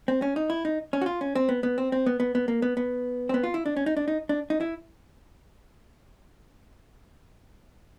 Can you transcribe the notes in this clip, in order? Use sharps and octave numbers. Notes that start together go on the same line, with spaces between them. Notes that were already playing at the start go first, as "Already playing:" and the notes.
C4
C#4
D#4
E4
D#4
C#4
F#4
F4
C#4
C4
B3
B3
C4
C4
B3
B3
B3
A#3
B3
B3
C4
B3
F4
E4
D4
C#4
D#4
D4
D#4
D4
D#4
E4